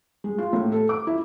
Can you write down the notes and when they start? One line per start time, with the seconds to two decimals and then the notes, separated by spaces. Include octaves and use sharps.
0.24 G#3
0.38 F4
0.53 A2
0.72 A4
0.89 D6
1.07 E4